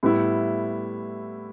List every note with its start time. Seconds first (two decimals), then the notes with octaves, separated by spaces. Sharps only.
0.03 A2 G3 B3 E4